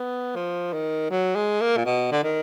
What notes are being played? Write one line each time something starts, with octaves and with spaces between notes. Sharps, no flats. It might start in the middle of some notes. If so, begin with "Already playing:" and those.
Already playing: B3
F3
D#3
F#3
G#3
A#3
A#2
B2
D3
D#3